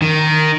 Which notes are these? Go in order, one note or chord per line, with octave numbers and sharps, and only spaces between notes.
D#3